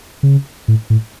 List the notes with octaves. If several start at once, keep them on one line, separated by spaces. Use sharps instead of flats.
C#3
A2
A2